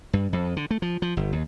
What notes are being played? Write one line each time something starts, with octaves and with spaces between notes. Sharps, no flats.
G2
F2
D3
A3
F3
F3
G1
D#2